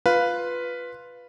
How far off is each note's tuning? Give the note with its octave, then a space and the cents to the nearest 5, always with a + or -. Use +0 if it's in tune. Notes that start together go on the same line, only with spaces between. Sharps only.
F4 +0 B4 +0 F5 +0